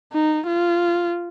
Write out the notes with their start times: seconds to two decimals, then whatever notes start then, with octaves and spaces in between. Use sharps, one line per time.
0.13 D#4
0.47 F4